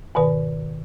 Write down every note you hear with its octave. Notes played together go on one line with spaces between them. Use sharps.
G#2 B2 D#3 B4